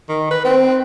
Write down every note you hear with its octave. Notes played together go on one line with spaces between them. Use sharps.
D#3
B4
C4